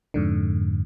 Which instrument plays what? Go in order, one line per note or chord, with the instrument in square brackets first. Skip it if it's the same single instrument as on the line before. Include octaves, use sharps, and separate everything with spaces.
[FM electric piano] F2 G#2 D3